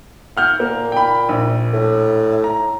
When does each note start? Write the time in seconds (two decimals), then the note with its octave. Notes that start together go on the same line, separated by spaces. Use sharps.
0.37 F#5 F6 G6
0.60 A#2 A#3
0.92 G5 B5
1.29 A#1
1.73 A2
2.44 A#5